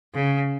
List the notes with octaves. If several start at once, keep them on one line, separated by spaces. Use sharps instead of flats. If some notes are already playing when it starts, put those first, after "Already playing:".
C#3